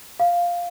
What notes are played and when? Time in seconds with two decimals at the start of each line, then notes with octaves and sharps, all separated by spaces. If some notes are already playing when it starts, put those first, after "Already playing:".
0.20 F5